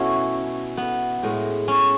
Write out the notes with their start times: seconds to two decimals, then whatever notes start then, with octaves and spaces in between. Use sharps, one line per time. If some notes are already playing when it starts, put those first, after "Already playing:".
Already playing: B2 A3 C#4 E4 F#4
0.77 B3
1.23 A2 G#3
1.68 C#4